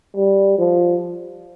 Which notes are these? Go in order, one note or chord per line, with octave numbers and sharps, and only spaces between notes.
G3
F3